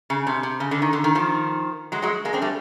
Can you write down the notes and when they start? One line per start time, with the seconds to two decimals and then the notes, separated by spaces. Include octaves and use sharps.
0.10 C#3
0.27 C3
0.43 C3
0.60 C#3
0.71 D3
0.82 D#3
0.93 D3
1.04 D#3
1.15 D#3 F3
1.92 F#3 G#3
2.02 F#3 G#3
2.25 G#3 A#3
2.33 C4 D4
2.42 G3 A3